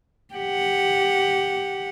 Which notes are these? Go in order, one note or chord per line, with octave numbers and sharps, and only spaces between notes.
G4 F#5